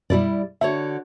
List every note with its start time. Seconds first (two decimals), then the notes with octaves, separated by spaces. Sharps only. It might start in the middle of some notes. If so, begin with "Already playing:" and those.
0.10 F#2 B2 G3 E4 D5
0.61 D3 F#4 C#5 E5